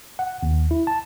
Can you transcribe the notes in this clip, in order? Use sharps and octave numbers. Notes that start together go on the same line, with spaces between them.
F#5
D#2
E4
A5